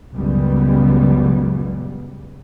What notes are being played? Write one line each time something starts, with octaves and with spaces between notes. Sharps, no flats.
C#2 F#2 A#2 C#3 G3 B3